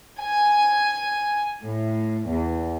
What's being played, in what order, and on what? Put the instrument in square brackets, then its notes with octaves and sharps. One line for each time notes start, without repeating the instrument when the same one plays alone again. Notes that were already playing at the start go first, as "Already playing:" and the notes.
[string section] G#5
A2
E2